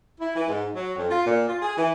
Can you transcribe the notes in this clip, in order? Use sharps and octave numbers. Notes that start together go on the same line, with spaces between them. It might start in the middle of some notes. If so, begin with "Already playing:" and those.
E4
E3
G#2
F#3
F2
F4
A#2
F4
G#4
E3